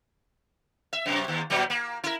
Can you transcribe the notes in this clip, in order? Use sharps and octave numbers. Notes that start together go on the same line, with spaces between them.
E5
F#2 C3
D#2
A#2 F#3 G3
A#3
E4 A#4